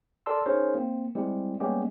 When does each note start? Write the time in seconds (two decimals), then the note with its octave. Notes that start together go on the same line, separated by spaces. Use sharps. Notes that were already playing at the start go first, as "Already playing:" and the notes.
0.26 A4 A#4 D5 A5 C6 E6
0.46 C#4 D#4 G#4 A#4 C5 C#5
0.75 A#3 C4
1.15 G3 G#3 C4 E4 G4
1.60 G3 G#3 A#3 B3 C#4 G4